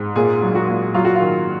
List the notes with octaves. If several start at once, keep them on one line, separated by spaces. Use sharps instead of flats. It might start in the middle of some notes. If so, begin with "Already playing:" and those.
Already playing: G#2
A#2 G#4
F#3
F#4
A#2
F#3 F4
F#4
F4
D#3